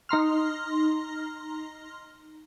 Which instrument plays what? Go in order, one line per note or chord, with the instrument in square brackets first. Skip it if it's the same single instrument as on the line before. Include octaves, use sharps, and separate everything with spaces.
[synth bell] D#4 A#5 C6 F6